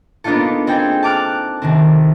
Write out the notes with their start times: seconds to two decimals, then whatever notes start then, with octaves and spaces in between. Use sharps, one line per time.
0.24 A#3 B3 D4 D#4 F4 A4
0.67 C4 D#4 G#4 A4 G5
1.03 A5 D6 F6 F#6
1.62 C2 D#3 C4